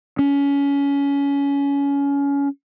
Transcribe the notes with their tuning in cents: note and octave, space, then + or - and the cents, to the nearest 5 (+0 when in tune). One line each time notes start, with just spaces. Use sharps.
C#4 +25